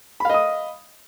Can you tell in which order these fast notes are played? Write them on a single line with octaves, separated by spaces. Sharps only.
B5 F5 D#5 D#6